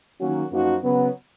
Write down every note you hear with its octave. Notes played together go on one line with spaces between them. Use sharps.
D#3 F#3 A#3 C#4 F#4
F#2 F3 A#3 D#4 F#4
C#3 F#3 B3